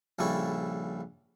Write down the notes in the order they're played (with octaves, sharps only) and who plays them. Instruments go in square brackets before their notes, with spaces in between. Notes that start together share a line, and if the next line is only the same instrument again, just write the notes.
[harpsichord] A#1 C#3 G3 E4 A4 C#6